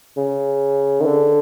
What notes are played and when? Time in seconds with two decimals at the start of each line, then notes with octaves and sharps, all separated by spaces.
0.17 C#3
1.01 D#3
1.06 D3